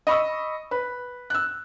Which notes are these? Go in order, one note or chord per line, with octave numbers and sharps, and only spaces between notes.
D#5 B5 C#6 E6
B4
E6 F#6